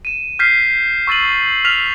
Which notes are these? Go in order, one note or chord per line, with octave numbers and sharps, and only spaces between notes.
D#7 E7
F6 G6 B6 C7
C#6 E6 A6 D#7 F#7
F6 B6 F7